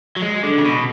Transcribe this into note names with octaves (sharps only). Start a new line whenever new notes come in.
F#3
G#3
D3
C#3
B2